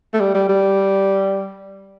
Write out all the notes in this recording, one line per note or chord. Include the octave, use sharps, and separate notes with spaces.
A3
G3
G3
G3